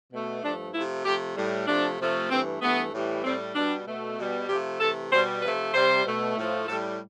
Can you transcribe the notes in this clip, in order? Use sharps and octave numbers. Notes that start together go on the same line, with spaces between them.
B2 A3
G2 F3 A3 D4
C3 F3 A3 E4
C3 F3 A3 G4
A2 G3
C3 F3 A3 D4
C3 F3 A3
G2 E3 A3 C4
G2 E3 A3 B3
A2 E3 G3
A2 G3 C4
B2 G3 D4
B2 A3
B2 G3
C3 F3 A3 G4
C3 E3 A3 A4
B2 G3 C5
C3 F3 A3 B4
C3 G3 C5
B2 A3
A2 F3 A3
A2 G3 A4